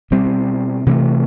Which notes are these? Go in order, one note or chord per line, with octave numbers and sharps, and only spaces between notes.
B2 G3 C4
C3 E3 A3